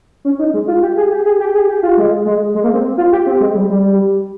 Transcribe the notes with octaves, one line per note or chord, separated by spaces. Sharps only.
C#4
D#4
G#3
F4
G4
G#4
G4
G#4
G4
G#4
G4
F4
G#3
G#3
G#3
A#3
C4
F4
G4
C4
G#3
G3
G3